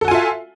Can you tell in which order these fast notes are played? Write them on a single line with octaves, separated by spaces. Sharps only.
A4 F#4 G#5 F4 E5